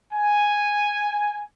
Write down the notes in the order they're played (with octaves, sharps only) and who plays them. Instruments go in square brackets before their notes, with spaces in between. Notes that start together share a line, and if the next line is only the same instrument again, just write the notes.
[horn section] G#5